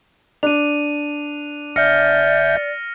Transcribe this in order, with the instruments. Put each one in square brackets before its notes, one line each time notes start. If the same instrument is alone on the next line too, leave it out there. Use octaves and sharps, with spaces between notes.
[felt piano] D4 [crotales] D#7 F7
[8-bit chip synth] G1 E5 G6 [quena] D5 [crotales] F6 A#6 C#7